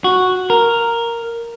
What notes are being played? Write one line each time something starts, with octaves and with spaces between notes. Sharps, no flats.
F#4
A#4